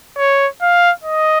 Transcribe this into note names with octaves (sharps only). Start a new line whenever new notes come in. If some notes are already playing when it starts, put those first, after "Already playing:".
C#5
F5
D#5